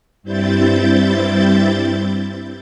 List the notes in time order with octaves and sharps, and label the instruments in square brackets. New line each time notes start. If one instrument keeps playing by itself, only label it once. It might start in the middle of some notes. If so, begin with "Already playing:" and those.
[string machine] G2 G3 C4 E4 G6 A6